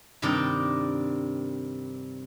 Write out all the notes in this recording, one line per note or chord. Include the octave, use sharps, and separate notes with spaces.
G2 C3 D#3 D4 D#4